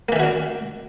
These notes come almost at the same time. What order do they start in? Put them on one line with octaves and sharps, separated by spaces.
A#3 E3 D#3 F#4 D4